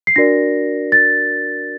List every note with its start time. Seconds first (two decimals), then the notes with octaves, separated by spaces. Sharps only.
0.07 C7
0.16 D4 F#4 A#4 D5 A#6
0.92 A6